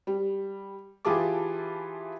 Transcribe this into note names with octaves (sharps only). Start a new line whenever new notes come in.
G3
E3 F4 G4 G#4 A5 D6